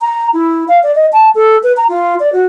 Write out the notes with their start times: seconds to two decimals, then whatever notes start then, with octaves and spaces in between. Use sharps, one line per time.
0.01 A#5
0.33 E4
0.68 F5
0.83 D5
0.95 D#5
1.13 A5
1.35 A4
1.63 B4
1.77 A#5
1.89 F4
2.20 D5
2.33 F#4